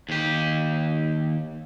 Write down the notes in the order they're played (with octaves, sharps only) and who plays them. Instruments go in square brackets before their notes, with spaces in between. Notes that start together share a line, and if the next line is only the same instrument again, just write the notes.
[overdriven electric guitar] D#2 G4